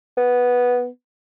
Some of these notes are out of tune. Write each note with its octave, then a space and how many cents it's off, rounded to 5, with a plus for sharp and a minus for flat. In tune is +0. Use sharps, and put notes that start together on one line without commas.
B3 -5